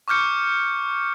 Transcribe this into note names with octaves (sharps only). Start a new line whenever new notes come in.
C#6 D6 F6 G6 C#7